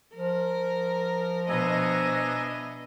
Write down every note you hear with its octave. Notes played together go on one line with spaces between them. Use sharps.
F3 A#4
B2 D4 D#5 E5 G#5 A#5